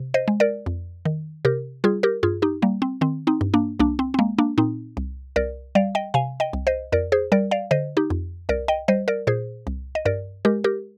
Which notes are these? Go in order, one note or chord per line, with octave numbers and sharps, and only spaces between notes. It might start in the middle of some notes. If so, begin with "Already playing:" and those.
Already playing: C3
C5 D#5
G#3
A#4 D5
F2
D#3
C3 G4 A#4
G3 F4 G#4
G4 A#4
G2 F4 G#4
D#4 G4
G3 A#3
C4
D#3 C4
C4 D#4
G2
A#3 D4
C2 A#3 D4
C4
C4
G#3 A#3
A#3 D4
A#2 C4 D#4
C2
C2 A#4 D5
G3 D5 F5
D#5 G5
C3 F5 G#5
D#5 G5
C2
C5 D#5
F2 A#4 D5
G#4 C5
G3 A#4 D5
D5 F5
D3 C5 D#5
D#4 G4
F2
C2 A#4 D5
D#5 G5
G3 C5 D#5
A#4 D5
A#2 G#4 C5
C2
D#5
G2 A#4 D5
G#3 G4 A#4
G4 A#4